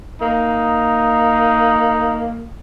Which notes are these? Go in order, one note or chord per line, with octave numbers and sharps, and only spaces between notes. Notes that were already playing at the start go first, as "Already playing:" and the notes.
A#3 D#4